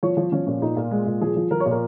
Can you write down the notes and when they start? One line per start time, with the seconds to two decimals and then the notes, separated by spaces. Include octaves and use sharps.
0.03 F3 C#5
0.17 F3
0.32 F3 C#4
0.47 A#2 C#4
0.62 A#2 D#4
0.76 A#2 F4
0.91 G#3
1.06 A#2
1.21 F3 G#4
1.36 F3
1.51 F3 A#4
1.60 C#5
1.66 A#2
1.71 A#4